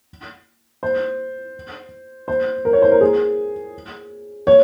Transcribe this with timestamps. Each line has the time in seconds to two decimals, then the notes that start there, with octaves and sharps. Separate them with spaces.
0.83 C5
2.28 C5
2.65 A#4
2.73 C#5
2.82 C5
2.91 A#4
3.01 G#4
4.47 C#5